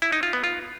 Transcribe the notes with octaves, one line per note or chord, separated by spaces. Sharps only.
E4
D#4
F4
B3
F4